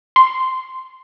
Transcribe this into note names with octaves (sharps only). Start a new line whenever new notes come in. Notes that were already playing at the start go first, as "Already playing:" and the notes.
C6